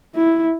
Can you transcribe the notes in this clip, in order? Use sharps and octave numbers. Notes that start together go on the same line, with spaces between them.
E4